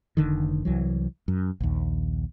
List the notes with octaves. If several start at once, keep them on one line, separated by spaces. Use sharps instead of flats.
F1 D3 D#3
C2 E3 F#3
F#2
A#1 D#2